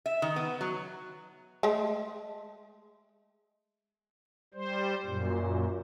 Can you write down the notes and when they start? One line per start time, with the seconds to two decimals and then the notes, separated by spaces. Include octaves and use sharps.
0.06 E5
0.22 D#3
0.36 B3
0.61 F#3
1.63 G#3 A3
4.54 G3 C5
5.05 F#2 A#2